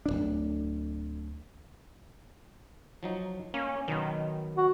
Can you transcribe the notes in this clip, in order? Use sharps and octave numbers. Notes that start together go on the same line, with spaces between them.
D1 G1 D4
F3 F#3 D#4
A#3 C#4
B2 D#3 F#3 B3
F#4